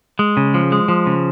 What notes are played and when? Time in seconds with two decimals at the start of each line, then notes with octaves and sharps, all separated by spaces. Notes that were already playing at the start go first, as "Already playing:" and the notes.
0.19 G#3
0.37 C#3
0.54 F3
0.72 G#3
0.88 F3
1.07 C#3